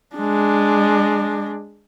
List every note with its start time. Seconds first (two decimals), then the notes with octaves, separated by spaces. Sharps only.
0.16 G#3 D4